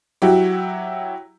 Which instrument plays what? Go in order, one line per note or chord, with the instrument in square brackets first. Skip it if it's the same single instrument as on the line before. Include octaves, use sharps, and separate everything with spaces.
[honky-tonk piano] F#3 E4 F#4 G4